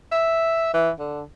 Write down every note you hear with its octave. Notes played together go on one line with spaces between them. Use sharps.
E5
E3
D3